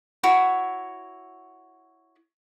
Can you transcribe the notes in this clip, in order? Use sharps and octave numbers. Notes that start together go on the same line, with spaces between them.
E4 F#4 C#5